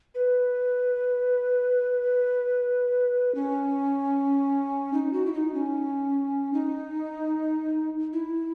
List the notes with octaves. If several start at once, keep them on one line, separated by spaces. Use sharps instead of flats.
B4
C#4
D#4
F#4
E4
D#4
C#4
D#4
E4